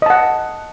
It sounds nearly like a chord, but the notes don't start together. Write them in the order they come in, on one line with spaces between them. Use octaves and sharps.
D#5 A5 F#5